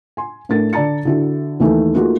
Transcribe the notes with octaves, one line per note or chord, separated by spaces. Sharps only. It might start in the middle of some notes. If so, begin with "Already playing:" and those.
G#5 C6
A2 A3 D4 A#4 A6
D3 D5 A5 A#5 A6 C#7
D3 E4 F#4
D#2 D#3 E3 A3 A#3
A3 A#3 D#4 F4 F#4 G#4